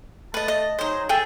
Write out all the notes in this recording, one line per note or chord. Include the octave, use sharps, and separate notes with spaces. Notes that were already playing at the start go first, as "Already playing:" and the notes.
A3 B4 D#5 A5
D#5
F#3 D#4 G#4 C5 D#5
G#4 A4 E5 G5